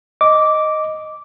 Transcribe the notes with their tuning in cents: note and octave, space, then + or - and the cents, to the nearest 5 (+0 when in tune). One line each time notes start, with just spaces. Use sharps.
D#5 +0 D6 -10